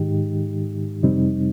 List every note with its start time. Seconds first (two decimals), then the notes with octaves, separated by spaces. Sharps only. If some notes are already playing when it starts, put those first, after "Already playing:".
Already playing: G#2 D#3 G#3 D#4 G4
1.03 F2 C3 G3 C4 D#4